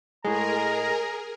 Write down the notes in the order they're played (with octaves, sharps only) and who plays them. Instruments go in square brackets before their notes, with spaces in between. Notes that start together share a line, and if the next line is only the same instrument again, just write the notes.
[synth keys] A2 G#3 [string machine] G#4 A#4 [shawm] A#5